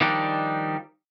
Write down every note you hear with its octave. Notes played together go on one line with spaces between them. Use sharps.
D#3 F3 G3 D4 D#4